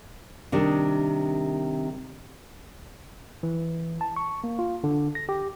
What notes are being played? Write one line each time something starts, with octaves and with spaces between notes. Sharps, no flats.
C3 D#3 G3 D4
E3
A5
C#6
A#3
F4
D3
A#6
G4